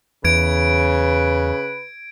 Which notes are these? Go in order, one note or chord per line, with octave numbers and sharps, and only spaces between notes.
E2 C#3 B4 G#6 D7